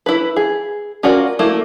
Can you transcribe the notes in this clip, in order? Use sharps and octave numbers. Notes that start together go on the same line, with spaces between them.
E4 B4
G#4
C#4 F4 F#4 A#4 D5
A3 A#3 E4